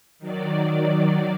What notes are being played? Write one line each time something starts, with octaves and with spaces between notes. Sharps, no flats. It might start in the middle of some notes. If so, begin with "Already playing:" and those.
D#3 F#3 D5